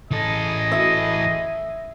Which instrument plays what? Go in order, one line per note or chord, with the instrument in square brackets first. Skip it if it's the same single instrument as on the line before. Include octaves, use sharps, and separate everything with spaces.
[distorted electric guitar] E3 A4 [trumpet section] G#4 D#5
[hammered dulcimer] E5